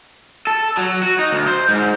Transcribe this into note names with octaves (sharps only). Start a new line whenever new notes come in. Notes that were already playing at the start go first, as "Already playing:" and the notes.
A4
F#3
F#4
D#4
D2
C5
G#2